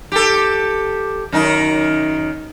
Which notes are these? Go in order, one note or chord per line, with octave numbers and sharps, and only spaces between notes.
G4 A4
F#2 D#3 D#4